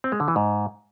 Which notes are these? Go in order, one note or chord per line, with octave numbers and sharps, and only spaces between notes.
C4
G#3
D3
E3
G#2